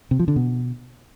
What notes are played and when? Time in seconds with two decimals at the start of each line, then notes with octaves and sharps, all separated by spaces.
0.11 C3
0.19 F3
0.28 D3
0.36 B2